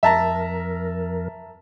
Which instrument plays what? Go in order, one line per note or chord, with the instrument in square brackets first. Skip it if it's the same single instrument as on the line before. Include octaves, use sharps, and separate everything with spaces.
[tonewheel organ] F2 A#4 [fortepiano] E5 A5 A#5